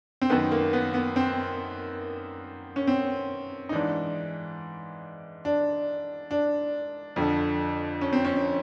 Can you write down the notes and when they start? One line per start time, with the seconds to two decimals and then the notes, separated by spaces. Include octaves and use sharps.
0.22 C4
0.30 F#2 D#3 B3
0.52 A#3
0.73 B3
0.94 B3
1.16 C4
2.76 C#4
2.87 C4
3.69 D#4
3.72 G#2 E3 D4
5.45 D4
6.31 D4
7.16 F2 D3 F3
8.01 C#4
8.13 C4
8.25 C#4